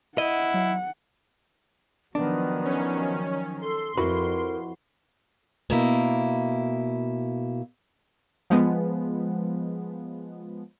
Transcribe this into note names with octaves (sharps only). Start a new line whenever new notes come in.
E4 D#5 F#5
F#3
D#3 F3 F#3 B3 D4
C#4
A4 C6
F2 E4 F#4 A#4 B4
B2 A#3 E4
F3 G#3 B3